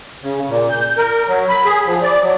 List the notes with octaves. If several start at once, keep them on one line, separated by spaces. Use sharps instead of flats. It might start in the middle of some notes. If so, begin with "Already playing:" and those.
C#3
A#2
G6
A#4
F#3
B5
G#4
F3
D5
F#3